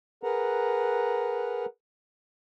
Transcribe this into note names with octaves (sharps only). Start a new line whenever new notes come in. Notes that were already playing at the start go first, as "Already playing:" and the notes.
G#4 A#4 B4 F#5 A#5